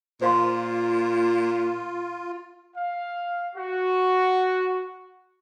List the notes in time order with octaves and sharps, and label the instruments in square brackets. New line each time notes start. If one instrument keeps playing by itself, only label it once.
[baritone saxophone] A#2 [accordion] F4 [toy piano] C5 F5 C6
[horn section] F5
F#4